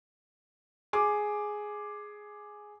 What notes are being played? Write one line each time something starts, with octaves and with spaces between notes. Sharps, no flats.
G#4 D6